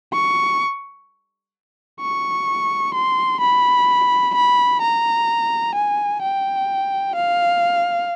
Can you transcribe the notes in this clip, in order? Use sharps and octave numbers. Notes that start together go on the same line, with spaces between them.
C#6
C#6
C6
B5
B5
A#5
G#5
G5
F5